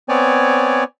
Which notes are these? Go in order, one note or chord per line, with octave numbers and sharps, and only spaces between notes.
B3 C4 C#5 D5 G#5